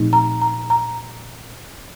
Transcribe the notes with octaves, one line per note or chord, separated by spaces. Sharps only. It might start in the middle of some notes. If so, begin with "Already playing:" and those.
Already playing: A#2 F3 A3 C4 D#4
A#5
A#5
A#5